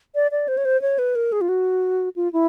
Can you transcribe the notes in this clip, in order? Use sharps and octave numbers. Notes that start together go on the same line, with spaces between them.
D5
D5
C5
C#5
C5
C#5
B4
A#4
G#4
F4
F#4
F4
E4